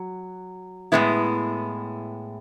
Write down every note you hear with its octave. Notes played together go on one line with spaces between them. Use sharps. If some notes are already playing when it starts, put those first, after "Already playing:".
Already playing: F#3
A2 F3 G#3 B3 E4